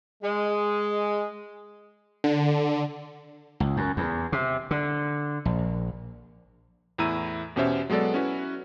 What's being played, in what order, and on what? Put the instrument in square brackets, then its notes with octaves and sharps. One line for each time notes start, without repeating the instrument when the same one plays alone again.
[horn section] G#3
[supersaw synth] D3
[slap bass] C#2
F#2
E2
C3
D3
A#1
[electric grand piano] E2 A2 E4 A#5 E6 D#7
E2 B2 C#4 G4 C5 E5
F#3 G#3 B3 A4 D5
C#4 E4 F#4 B4